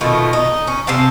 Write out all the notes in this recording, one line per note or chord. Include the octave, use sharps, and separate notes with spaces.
B2 D#3 A3 F4
D#4
C#4
C3 C4 F5 A5